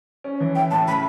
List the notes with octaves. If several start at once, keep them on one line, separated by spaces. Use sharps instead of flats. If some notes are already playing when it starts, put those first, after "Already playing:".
C#4
E3
E4 G5
A2 A5
C#3 B5